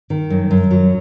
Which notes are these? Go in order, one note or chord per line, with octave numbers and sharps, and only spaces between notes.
D#3
F#2
F#2
F#3